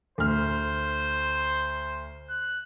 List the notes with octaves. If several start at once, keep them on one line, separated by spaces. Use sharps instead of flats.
D2 C5 F6
F#6